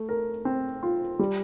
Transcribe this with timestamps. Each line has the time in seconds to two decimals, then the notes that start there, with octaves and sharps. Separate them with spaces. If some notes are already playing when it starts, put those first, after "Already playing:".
Already playing: A3
0.09 A#4
0.45 C4
0.83 F4
1.19 G3